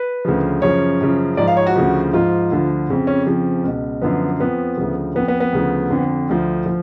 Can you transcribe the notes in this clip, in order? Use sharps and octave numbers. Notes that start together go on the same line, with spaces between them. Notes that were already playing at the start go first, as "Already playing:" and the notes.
Already playing: B4
D2 C#3 F3
F#2 C#3 F3 C#5
F#2 C#3 F3
G#2 F3 D5
F5
C#5
F#4
D2 C#3 F3
G#2 F3 F4
D2 D3 F3
F2 C#3 F3
C#4
F2 C#3 F3
C#2 B2
F#2 D3 F3 B3
F2 F3 B3
D2 C#3 F3
F2 F3 B3
B3
B3
D2 C#3 F3
F2 D3 F3
D2 D3 F3
F3